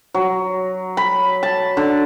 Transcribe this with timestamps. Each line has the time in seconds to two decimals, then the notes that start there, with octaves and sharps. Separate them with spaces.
0.14 F#3
0.97 B5
1.43 A5
1.77 D3